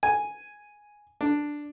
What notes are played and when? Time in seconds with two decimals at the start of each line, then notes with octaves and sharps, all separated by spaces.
0.03 G#5
1.21 D4